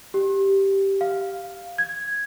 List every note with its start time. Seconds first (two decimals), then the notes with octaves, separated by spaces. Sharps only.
0.14 G4
1.01 F5
1.78 G#6